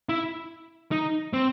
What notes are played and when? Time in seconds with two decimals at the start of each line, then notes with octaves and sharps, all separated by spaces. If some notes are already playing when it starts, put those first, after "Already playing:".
0.09 E4
0.92 D#4
1.33 C4